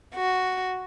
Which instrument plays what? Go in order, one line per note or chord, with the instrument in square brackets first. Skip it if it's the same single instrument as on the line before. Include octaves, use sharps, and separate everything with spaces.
[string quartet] F#4